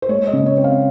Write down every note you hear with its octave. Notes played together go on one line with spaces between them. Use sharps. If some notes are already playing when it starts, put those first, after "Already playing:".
C5
G#3 C#5
D#5
C#3
C#5
C4
F5